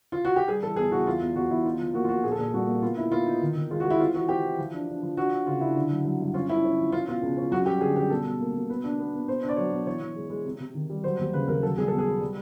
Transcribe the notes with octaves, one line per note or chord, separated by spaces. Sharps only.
F4
F#4
G4
G3 G#4
E3 A4
E2 G#4
E3 F#4
E2 F4
E2
E2 F#4
E2 E4
D#4 F4
F3
A#3 F#4
F4
F3 F#4
A#2 G#4
A4
A#2 G#4
C2 F#4
A#3
B3 F4
D#4 E4
B3 F4
D#4
D#3
D#3
G#3 F4
F#4
G#3
E4
C4 F4
E3 F#4
C4 G4
E3
F3
D4
D4
F3
D4 F#4
D4
C#3 F4
D4 E4
D3
F#3
F#3
G2
C#4 F4
C#4 E4
C#4
F3
C#4 F4
B2 F4
C#2
C#4
F#2 F#4
G3 G4
D3 G#4
G3 G4
B2 A4
B2
A#3
B2
B3 B4
D4
B3
B3
B2 C5
D4
D5
F#3 C#5
B2
E3 C#5
E3
G#3
G#3
C3
C3
D#3
G3
F#3 C5
D#2
C#3 B4
D#2 A#4
F#3 A4
C2 G#4
B2 A4
G#4
B3
G3